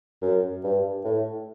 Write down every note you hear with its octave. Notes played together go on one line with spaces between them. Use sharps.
F#2
G2
A2